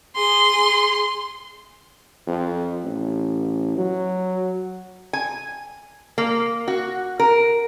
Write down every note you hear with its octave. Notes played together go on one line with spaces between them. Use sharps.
G#4 C6
F2
A1
F#3
G#5
A#3
F#4
A#4